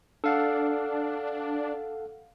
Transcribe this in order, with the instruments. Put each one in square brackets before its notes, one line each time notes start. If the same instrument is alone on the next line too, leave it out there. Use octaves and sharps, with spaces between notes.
[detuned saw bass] D4 [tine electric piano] A4 F5 F#5